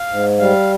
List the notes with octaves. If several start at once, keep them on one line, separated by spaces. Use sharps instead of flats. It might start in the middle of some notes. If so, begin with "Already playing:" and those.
Already playing: F5
G#2
G3 F5